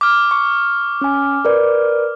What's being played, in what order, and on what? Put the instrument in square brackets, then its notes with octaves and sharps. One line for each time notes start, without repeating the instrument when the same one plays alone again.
[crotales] D6 F6
[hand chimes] C#6
C#4 G#5
A#4 B4 D5